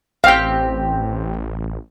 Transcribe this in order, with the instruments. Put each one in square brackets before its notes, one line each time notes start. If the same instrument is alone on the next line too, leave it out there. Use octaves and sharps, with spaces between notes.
[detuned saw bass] A1 [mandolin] C4 G4 [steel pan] F5 G5